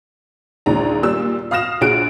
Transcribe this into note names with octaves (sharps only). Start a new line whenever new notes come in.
A#1 D#2 G#3 C#4 D4 A#5
A#2 G3 E6
F5 D#6 F6 A#6 E7
A#1 F#4 G#4 F#6 D7